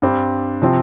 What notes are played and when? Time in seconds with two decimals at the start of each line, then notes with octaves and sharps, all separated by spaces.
0.02 G2 G3 C4
0.62 C3 F3 C4